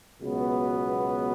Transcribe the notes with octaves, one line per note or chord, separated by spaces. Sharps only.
C#2 B2 F#3 B3